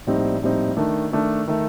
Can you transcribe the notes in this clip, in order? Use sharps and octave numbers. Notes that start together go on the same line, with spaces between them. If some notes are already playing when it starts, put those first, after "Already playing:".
A#1 A2 G3 C4 D#4
A#1 A2 G3 C4 D#4
D#3 A3 D4
D#3 A3 D4
D#3 A3